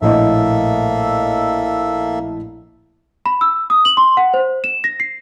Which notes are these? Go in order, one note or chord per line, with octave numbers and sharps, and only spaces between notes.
A#1 A2 A#3 A4 D#5 E5
B5
E6
D#6
F#7
C6
F#5
C5
E7
A#6
C7